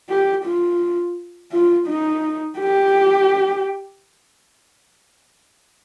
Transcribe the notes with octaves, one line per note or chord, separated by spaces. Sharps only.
G4
F4
F4
D#4
G4